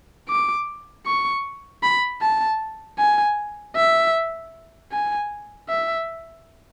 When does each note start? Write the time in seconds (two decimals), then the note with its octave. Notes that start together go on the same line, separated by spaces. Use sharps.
0.29 D6
1.06 C#6
1.83 B5
2.22 A5
2.98 G#5
3.76 E5
4.92 G#5
5.69 E5